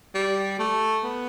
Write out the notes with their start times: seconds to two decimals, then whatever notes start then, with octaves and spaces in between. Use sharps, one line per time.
0.15 G3
0.59 A3
1.04 B3